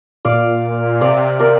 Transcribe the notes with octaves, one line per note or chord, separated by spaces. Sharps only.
A#2 D5 F5
C3 D5 F5
A#4 D5